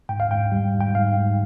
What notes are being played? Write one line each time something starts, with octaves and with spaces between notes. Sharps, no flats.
G#2 G5
F5
G#2 G5
G3
G#2
G5
G#2 F5
G#2